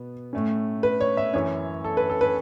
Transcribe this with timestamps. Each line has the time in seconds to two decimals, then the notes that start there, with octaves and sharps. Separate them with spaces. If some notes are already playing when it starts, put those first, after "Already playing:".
Already playing: B2 B3
0.33 A2 A3 C#4
0.83 B4
1.01 C#5
1.17 E5
1.33 F#2 E3 C#4 C#5
1.84 A4
1.97 B4
2.10 A4
2.21 B4